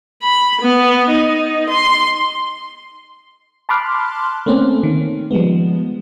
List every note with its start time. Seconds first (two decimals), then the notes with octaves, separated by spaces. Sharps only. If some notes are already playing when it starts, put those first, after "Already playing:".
0.23 B5
0.61 B3
1.10 D#4
1.69 C6
3.69 A5 B5 C6 D6 F6 F#6
4.46 A3 A#3 C4 C#4
4.83 D#3
5.31 F3 G3 G#3 B3